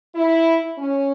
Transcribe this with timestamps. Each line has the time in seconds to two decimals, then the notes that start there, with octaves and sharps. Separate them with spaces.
0.15 E4
0.79 C#4